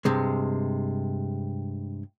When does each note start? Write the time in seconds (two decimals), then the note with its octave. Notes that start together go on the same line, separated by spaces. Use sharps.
0.05 G2 C3 G#3